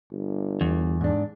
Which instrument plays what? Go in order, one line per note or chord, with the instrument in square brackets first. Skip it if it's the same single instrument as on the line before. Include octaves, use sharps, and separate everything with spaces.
[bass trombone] G1
[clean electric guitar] E2
[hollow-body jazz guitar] G#2 D4